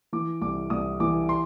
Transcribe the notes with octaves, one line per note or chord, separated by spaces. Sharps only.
E3 D6
C2 D6
C2 D#6
E3 D6
C6